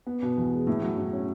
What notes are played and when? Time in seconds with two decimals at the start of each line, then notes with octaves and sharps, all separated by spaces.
0.07 B3
0.22 B2
0.38 E2
0.53 G#3
0.67 A2
0.82 F#3
0.98 A2
1.13 C#4